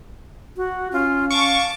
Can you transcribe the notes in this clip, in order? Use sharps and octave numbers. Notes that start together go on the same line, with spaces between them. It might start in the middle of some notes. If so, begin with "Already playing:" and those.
F#4
C#4 F4
F5 A5 C#6 D6